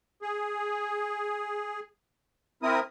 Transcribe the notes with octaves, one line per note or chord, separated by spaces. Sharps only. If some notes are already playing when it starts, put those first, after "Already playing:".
G#4
C4 E4 A#4 D#6